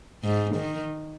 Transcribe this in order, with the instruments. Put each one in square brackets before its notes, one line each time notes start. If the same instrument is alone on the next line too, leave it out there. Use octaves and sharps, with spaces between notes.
[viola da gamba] G#2
D#3